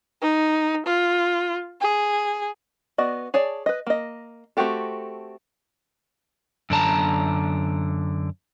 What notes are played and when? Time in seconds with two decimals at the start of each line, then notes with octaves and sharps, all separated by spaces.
0.22 D#4
0.86 F4
1.81 G#4
2.98 B3 F#4 D5 D#5
3.34 G#4 C#5 D5 A5
3.66 B4 D#5
3.87 A#3 D#5
4.57 A3 C4 F#4 G4 A4
6.70 F#2 D3 A5 A#5